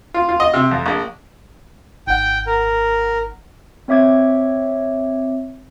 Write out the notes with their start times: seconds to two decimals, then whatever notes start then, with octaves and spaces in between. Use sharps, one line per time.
0.14 F4
0.29 F4
0.40 D#5
0.54 C3
0.71 F2
0.86 A#1
2.07 G#1 F#5 G5
2.47 A#4
3.88 C4 C#5 E5 D6 G#6